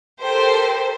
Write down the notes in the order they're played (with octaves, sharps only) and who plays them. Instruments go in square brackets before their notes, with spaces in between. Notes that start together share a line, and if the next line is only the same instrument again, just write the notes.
[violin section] G4 A4 A#4 C5